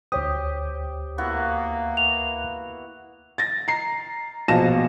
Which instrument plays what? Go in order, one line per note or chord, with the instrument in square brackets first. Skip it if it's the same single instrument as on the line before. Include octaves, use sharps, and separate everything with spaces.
[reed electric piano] D2 C#5 D#6 [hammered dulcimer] G4 [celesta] C5
[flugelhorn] A#3 [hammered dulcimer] B3 E4 F#4
[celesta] F7
[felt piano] A6 A#6
A#5 C7
A#1 B2 F5 A5 A#6 E7